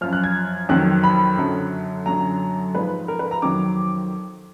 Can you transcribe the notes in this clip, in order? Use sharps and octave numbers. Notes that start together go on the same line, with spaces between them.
F#2 F3 F6
F#6
G#6
F2 D#3 F#3 F#6
B5
F#2 D3 F#3
F#2 D3 F#3 A#5
G#2 F3 B4
A#4
B4
A#5
F2 D#3 F#3 D6